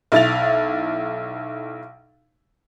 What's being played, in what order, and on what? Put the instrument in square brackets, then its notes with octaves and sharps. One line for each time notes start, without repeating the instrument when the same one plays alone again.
[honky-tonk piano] B1 E4 A6 F7